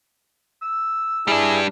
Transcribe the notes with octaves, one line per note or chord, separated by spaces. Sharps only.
E6
G3 D4 E4 G#4